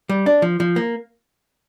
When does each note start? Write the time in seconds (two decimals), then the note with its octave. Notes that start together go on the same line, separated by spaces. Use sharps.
0.09 G3
0.26 D4
0.42 F3
0.60 F3
0.76 A#3